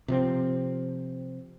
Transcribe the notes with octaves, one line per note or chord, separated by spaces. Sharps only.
C3 F3 C4